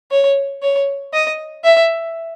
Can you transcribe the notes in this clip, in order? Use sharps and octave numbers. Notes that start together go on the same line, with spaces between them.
C#5
C#5
D#5
E5